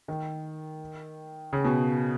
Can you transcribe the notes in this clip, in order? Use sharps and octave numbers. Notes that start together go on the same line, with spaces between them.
D#3
C#3
B2